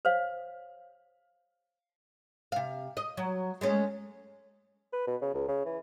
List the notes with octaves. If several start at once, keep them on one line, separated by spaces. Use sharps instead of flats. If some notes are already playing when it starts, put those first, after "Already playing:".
C5 C#5 F5
C3 F5
D#5
F#3
G#3 A3 C#4
B4
B2
C#3
C#2
C#3
E3